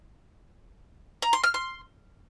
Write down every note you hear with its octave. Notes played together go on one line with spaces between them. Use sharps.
A#5
C6
F6
C6